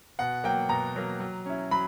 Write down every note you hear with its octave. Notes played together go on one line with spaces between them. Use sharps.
B2 F#5
F#3 A#3 G5
B2 A#5
F#3 A#3
F#3
C#4 E4
F#3 B5